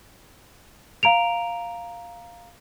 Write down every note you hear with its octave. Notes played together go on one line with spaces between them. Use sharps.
F5 A#5 D7 F7